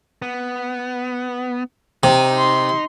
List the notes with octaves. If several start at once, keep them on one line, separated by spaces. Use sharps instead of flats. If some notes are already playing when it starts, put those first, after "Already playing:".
B3
C3 D#4
C6